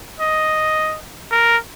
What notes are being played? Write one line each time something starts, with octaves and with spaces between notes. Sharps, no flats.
D#5
A#4